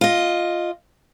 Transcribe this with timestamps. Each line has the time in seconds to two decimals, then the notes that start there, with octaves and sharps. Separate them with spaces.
0.01 F4 D#5